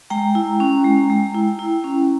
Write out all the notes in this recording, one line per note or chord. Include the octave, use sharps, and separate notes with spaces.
G#3 G5 A#5
E4
C#4
G#3
G#3
E4
E4
C#4